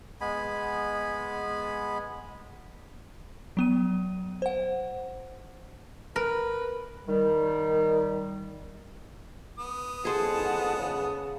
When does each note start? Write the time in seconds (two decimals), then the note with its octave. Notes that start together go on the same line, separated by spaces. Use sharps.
0.21 G#3 B3 G#5 B5
3.57 F#3 B3 D#7
4.42 C5 F#5
6.16 A#4 B4
7.08 D#3 G3
9.58 B3 D#6
10.05 F2 G#4 C5 F#5 A5
10.78 C#3